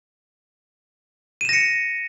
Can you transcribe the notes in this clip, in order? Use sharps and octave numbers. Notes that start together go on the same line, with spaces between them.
A#6 C#7 D#7 E7